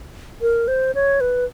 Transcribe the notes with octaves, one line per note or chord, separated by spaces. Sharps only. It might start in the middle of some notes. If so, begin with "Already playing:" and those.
A#4
C5
C#5
B4